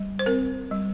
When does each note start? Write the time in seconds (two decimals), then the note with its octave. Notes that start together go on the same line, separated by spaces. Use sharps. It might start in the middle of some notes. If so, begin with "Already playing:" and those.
Already playing: G3
0.19 C5
0.26 C4 A#4
0.71 G3